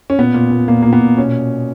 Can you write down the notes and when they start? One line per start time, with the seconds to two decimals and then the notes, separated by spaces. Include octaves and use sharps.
0.10 C#4
0.18 A#2 B3
0.34 A#2
0.51 A#2
0.68 A#2 A#3
0.82 A#2 A#3
0.93 B3
1.01 A#2
1.18 B2 C#4